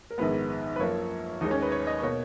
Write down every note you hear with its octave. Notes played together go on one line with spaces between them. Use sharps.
A#4
A#1 G#2 D#3 G#3 B3 B4
B4
F#2 F3 A#3 C#5
D#2 D#3 G#3 D#4
C#4
B4
C#5
D#5
B2 A#3 C#5